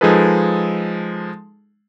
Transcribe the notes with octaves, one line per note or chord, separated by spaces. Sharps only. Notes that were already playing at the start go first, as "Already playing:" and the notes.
F3 G#3 D#4 G#4 A4 B4